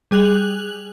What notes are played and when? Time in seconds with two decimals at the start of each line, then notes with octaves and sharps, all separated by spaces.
0.11 G3 G#4 F#6 F7 F#7